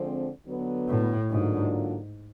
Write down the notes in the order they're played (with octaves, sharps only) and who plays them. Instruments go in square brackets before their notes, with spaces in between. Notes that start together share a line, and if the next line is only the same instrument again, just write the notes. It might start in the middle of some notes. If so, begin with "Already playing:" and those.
Already playing: [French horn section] D3 F3 G#3 C4
D3 F#3 B3
[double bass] A2
[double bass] G#2 [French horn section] D3 F#3 A#3 D4 F4